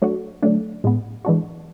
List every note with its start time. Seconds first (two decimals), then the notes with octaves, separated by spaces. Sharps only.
0.02 F#3 A3 D4 F#4
0.43 D3 F#3 A3 D4
0.84 A2 G#3 B3
1.25 E3 G#3 D4 F#4